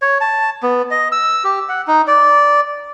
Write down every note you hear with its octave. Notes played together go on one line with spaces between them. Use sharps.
C#5
A5
B3
D#5
E6
G4
F#5
D#4
D5